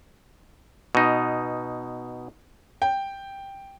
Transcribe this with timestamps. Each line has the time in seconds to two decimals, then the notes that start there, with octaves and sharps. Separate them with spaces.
0.95 B2 D#4
2.82 G5